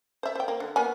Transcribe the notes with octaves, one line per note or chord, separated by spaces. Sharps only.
C5 E5
C5 G5
A#3
D3
A#3 B3 G#5